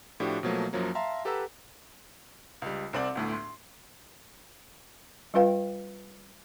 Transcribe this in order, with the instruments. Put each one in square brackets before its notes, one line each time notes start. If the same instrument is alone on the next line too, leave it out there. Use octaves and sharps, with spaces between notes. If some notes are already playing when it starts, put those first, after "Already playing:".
[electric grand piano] A2 F3 D4 F#4 G4
B2 F3 F#3 A3 A#3
F#2 F3 F#3 A#3
E5 F5 A5 A#5 C6
G4 A4 B4 F#5 A#5 E6
[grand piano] C#2 G3
C2 C4 D5 D6
G1 D2 A2
C6
[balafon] G3 C#4 F4 B4 F5 G5